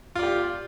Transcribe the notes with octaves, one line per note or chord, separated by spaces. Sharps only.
F4 G4 D5